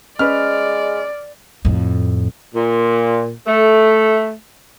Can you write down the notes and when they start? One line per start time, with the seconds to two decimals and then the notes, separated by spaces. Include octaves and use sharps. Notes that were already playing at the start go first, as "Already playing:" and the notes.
0.19 G#3 C#4 G#4 B4 D5 F6
1.65 F2 A2
2.55 A#2
3.47 A3